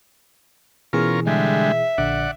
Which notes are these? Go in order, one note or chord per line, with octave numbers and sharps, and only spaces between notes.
B2 E3 C#4 F4 G#4 A#4
D3 G3 G#3 E5
A#1 D3 D5 F#5